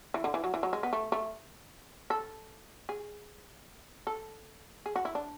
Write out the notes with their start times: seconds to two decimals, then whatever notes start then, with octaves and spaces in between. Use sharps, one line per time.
0.14 E3
0.24 D3
0.34 E3
0.44 F#3
0.54 E3
0.63 F#3
0.73 G#3
0.83 B3
0.93 A3
1.12 A3
2.10 A4
2.89 G#4
4.07 A4
4.86 G#4
4.96 F#4
5.05 E4
5.15 D4